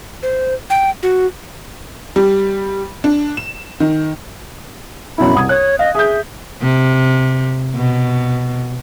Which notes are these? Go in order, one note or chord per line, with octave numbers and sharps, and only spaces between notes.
C5
G5
F#4
G3
D4
E7
D#3
F#2 B2 E4 B5
C2 D#6 G#6
C#5 F#6
D#5 F5
G#4 E5 G6
C3
B2